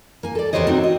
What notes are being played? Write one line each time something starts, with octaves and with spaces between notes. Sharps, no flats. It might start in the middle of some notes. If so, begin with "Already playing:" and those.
A#3 G#5
A4 D5
E2 D#3 G4 C5 C#5 D#5
C4 D#4 F#4 A#4
D#5